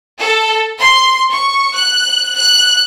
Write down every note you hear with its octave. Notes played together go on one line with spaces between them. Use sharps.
A4
C6
C#6
F#6
F#6